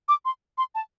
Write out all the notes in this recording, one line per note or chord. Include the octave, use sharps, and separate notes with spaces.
D6
C6
C6
A5